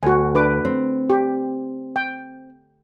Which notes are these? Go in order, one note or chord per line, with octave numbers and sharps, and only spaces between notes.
D2 F#4 G#5
D4 B4 D6
C4
G4
G5